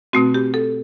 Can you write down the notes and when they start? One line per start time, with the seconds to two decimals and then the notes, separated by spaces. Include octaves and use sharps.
0.13 B2 A3 C4 F#4
0.34 G4
0.54 A4